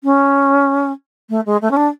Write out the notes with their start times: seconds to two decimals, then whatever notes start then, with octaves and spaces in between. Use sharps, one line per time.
0.04 C#4
1.30 A3
1.46 G#3
1.62 A3
1.71 C#4
1.77 D4